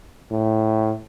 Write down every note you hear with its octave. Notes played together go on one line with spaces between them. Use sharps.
A2